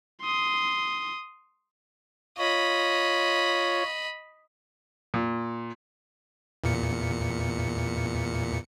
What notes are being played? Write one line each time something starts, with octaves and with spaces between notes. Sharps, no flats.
C6 D#6
F4 C#5 D#5 B5
A#2
E2 A#2 C#7